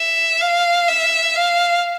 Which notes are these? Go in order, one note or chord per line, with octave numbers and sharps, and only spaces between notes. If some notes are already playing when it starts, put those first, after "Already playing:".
Already playing: E5
F5
E5
F5